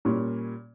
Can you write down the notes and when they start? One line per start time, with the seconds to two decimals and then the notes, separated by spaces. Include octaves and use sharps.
0.05 A#2 G3 A#3 C#4